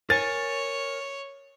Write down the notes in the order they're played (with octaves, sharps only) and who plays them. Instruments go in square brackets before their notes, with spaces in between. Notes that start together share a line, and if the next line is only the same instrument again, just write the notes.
[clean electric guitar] A#4 G#5 [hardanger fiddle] C#5 [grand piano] A6